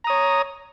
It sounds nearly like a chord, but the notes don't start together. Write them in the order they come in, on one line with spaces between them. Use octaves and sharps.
A#5 D#6 C#5